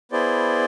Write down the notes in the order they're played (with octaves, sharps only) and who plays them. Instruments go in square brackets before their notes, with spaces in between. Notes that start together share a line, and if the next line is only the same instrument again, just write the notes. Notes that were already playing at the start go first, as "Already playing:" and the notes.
[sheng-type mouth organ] B3 E4 G#4 C5 D5